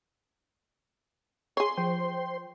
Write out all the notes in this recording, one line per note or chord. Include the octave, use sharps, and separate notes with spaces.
G#4 C#5 C6
F3 C5 G5